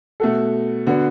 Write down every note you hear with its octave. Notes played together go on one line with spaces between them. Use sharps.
B2 A3 F#4 A4
D3 B3 F#4